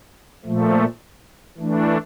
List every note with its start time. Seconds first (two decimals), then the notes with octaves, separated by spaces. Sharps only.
0.45 A#2 F3 A3
1.57 E3 A3 D4